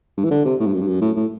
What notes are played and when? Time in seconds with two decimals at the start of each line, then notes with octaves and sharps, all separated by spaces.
0.17 G2
0.24 E3
0.31 D3
0.45 C3
0.60 A2
0.67 G2
0.74 F#2
0.81 G2
0.88 F#2
1.01 A2
1.16 A2